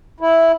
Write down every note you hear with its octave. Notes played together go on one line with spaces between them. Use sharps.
E4